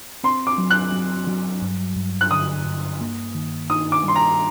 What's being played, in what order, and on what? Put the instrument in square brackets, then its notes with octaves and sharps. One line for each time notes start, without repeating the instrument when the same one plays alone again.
[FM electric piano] C4 [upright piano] C6
[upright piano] D6
[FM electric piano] F#3
[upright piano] F#6
[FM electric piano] F#3
F#3
G2
G2
[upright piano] F#6
[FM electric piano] D3 [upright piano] D#6
[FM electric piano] G2
A#3
D#3
[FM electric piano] D#4 [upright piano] D#6
[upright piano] D6
[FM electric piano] G3 [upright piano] C6
[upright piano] A#5